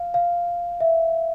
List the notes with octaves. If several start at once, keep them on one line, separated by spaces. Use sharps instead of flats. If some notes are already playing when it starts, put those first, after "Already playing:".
Already playing: F5
F5
E5